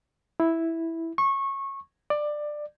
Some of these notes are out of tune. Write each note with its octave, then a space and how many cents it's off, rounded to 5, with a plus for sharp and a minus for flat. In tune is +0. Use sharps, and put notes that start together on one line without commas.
E4 -5
C#6 -20
D5 +15